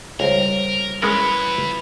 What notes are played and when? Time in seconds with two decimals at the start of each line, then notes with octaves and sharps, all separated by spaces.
0.20 C#2 G3 A#4 C5 C#5
1.02 E3 G#3 B3 C#4 E4 A#4 B4 B5